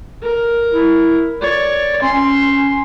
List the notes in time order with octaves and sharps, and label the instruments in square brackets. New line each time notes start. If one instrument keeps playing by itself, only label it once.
[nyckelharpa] A#4
[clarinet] E4
[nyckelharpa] C#5 [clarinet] D5
[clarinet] C#4 [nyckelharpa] C6